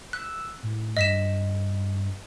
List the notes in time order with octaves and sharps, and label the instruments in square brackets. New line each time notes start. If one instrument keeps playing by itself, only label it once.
[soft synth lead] E6 [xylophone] F#6
[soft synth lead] A2
[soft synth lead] G2 [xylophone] D#5 B6 E7